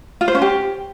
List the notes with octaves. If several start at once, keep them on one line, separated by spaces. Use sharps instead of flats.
F4
C5
C#4
G4